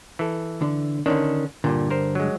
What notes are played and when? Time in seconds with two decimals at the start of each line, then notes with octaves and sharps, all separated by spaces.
0.19 E3 A4
0.62 D3
1.06 D3 D#3 C#4 D4
1.64 G2 A#2 D3
1.90 A#4 C5
2.15 F#3 G#3